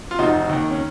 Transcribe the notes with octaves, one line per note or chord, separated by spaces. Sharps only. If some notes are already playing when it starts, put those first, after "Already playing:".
F4
F1 D#4 F#4
D#2 D#3
C#4